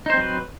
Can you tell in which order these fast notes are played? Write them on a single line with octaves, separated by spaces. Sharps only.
D#4 C5 C4 F#3 B4